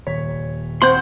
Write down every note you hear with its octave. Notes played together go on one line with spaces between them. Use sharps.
D#1 C#5 B6
C4 F#5 C6 G6